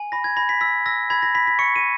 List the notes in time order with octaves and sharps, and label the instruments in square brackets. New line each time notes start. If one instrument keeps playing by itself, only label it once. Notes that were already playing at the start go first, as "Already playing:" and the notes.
Already playing: [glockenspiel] G#5
B5 A#6
G#6
B5 A#6
B6
E6 B6
E6 A#6
B5 G#6
A#6
B5 B6
B6
C#6 C#7
D#7